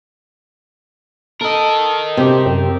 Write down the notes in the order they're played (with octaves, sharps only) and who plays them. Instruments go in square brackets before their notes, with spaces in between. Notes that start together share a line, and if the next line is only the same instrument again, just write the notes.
[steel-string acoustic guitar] A4 [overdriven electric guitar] A#4 D#5
[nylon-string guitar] C3 [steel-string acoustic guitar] C4 G4
[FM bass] F#2